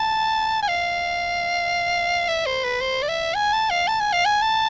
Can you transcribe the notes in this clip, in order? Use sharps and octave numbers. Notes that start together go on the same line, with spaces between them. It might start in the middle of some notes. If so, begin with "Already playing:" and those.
Already playing: A5
G#5
F5
E5
C5
B4
C5
D5
E5
G#5
A5
F5
A5
G#5
F5
G#5
A5